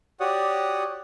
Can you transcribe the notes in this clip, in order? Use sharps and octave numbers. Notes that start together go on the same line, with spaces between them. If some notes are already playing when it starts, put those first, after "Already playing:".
F#4 G4 C#5 D5 F#5 D#6